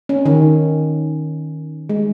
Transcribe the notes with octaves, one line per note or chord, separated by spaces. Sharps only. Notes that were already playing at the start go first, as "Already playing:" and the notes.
C#4
D#3
G#3